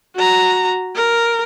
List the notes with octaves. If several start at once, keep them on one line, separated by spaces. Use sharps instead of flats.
F#4 A#5
A#4